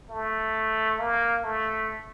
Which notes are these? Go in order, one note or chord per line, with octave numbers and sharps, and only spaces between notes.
A3
A#3
A3